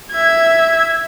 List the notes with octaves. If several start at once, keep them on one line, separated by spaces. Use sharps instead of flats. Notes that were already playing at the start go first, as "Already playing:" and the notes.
E5 G#6